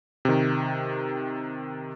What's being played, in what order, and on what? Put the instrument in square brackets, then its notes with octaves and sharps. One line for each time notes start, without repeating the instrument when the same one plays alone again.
[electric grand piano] C3 D#3